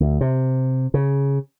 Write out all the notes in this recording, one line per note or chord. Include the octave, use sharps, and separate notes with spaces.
D2
C3
C#3